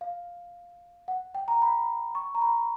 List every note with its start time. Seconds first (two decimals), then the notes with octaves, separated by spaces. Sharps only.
0.01 F5
1.08 F#5
1.35 G5
1.48 A#5
1.62 B5
2.15 C#6
2.35 A#5
2.42 B5